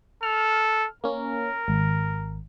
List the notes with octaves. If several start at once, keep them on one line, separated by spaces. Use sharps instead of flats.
A4 F6
A#3 C#4 A#4
G#1